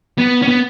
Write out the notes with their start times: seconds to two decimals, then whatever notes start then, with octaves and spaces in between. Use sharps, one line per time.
0.18 B3
0.42 C#4
0.48 B3